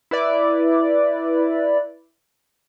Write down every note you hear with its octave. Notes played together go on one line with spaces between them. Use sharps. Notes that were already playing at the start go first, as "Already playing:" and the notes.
E4 B4 D5